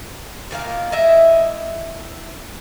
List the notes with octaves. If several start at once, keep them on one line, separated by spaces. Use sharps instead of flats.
A#2 D#3 A#3 F5
E4 D#5 E5